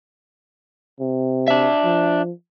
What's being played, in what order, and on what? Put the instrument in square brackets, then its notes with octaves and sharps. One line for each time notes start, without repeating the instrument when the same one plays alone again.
[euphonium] C3
[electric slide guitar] D4 E5
[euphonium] F3